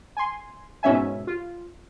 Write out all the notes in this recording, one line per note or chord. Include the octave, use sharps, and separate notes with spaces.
G#5 C6
G#2 B2 C#4 E5 G#5
F4